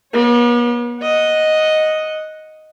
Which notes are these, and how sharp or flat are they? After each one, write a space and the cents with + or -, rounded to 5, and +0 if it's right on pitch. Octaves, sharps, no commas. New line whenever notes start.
B3 -45 C#5 -20
D#5 +0 F#5 -5